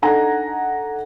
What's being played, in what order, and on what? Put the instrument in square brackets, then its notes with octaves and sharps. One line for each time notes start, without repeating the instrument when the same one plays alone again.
[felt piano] D4 D#4 A4 F#5 G#5 A#5